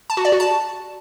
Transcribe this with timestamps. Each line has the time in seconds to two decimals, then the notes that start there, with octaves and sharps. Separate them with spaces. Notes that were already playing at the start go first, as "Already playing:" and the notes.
0.10 A5
0.17 F#4
0.25 D5
0.32 F#4
0.40 A5